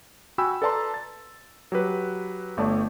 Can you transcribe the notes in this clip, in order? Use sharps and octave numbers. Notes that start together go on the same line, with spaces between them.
F#4 G5 G#5 B5 E6
A4 B4 D5 A5 A#5 C6
A6
F#3 G4 B4
G1 A3 C#5 D5 A5